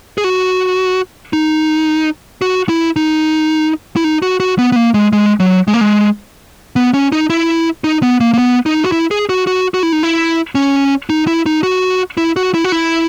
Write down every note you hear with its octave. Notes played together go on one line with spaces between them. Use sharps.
G#4
F#4
D#4
F#4
E4
D#4
E4
D#4
F#4
F#4
B3
B3
A#3
G#3
G#3
F#3
G#3
A#3
G#3
B3
C#4
D#4
E4
D#4
B3
A#3
A#3
B3
D#4
F#4
E4
G#4
F#4
F#4
F#4
E4
D#4
E4
C#4
D#4
E4
D#4
F#4
E4
F#4
E4
F#4
E4